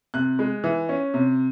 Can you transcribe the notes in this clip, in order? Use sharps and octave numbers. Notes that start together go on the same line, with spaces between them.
C3 F#6
G#3
E3
C#4
C3